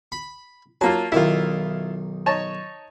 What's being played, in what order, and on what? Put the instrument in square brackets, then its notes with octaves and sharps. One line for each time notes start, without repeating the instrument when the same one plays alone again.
[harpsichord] B5
[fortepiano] F#3 A#3 F4 [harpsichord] A5
[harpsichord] B1 D#3 [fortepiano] E4 F4
[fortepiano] D#4 C#5 A5